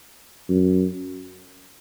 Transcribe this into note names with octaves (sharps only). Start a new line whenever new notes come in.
F#2